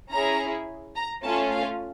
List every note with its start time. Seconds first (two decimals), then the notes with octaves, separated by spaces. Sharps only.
0.11 C#4 E4 G#4 A#5
0.95 A#5
1.23 A3 C#4 F4 A5
1.51 F5